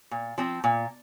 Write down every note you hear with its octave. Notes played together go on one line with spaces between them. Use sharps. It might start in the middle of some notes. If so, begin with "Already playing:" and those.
A#2
F3 C4
A#2